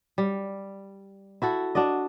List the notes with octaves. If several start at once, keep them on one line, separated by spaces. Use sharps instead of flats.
G3
E4 F#4 A4
D4 F#4 D5 D#5